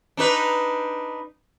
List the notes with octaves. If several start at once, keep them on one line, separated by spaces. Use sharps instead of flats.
D4 D#4 B4